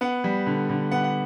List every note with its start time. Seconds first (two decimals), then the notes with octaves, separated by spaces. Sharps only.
0.01 B3 F#5
0.24 G3
0.46 D3
0.69 D3
0.91 B3 F#5
1.04 F#5